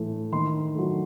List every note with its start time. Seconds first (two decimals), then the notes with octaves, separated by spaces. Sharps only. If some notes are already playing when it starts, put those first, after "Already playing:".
Already playing: A2 E3 A3
0.32 D#3 C6
0.75 F#3 A3